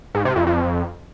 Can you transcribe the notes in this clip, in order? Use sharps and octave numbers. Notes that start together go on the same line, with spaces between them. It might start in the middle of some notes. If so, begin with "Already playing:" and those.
G#2
C3
F2
F2